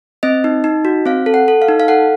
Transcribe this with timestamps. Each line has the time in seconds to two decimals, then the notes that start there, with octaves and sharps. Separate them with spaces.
0.23 C4 D#5
0.44 D#4
0.64 D#4
0.85 F#4
1.06 C4 F5
1.26 A4
1.34 F#5
1.48 A4
1.62 F5
1.69 D#4
1.80 F5
1.88 A4 F#5